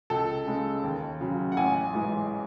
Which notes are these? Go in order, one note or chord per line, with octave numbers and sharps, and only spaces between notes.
C#2 A4
C#3 G#3
D#2
C#3 F#3
F#5
A1 G#5
G#2 E3 G#3